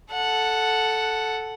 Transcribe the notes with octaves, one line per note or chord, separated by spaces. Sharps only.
A4 F#5